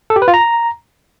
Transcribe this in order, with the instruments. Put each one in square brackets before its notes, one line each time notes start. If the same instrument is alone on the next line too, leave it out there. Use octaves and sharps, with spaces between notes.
[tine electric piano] A4
G4
B4
F4
A#5